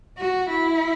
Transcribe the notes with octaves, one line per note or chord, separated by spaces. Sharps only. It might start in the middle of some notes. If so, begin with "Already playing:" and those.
F#4
E4